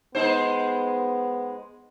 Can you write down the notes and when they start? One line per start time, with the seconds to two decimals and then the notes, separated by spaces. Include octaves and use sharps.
0.15 G#3 B3 D#4 C5